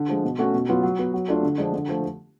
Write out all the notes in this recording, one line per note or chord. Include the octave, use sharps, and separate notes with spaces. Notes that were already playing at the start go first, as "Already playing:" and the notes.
Already playing: D3
F3 G#3
B2
A3 C#4 F#4
B2
F#3 B3 F4
F#3
B3 F#4
F#3
A3 D4 F4
D3
F3 G#3 D4
D3
F3 A3